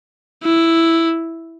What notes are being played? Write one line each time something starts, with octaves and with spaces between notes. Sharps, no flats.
E4